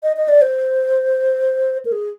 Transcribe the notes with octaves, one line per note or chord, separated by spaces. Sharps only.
D#5
D#5
D5
C5
A#4
G#4